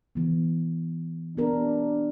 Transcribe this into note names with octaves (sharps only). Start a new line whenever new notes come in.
E3 B3
B3 D4 G4 A#4